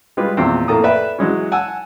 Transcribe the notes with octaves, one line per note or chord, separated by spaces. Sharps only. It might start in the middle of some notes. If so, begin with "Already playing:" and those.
G3 G#3 F4 B4
E2 A#2 D#3 C4
F2 A2 A#3 A4 A#5 D#6
A4 B4 D5 E5 G5 B5
E3 F#3 G#3 C#4
F#5 G#5 A5 E6